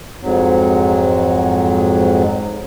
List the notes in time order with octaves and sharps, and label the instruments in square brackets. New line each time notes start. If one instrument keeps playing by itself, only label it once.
[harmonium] F2 G#2 F#3